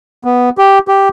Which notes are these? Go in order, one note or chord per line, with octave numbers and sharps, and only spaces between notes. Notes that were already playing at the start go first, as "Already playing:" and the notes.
B3
G4
G4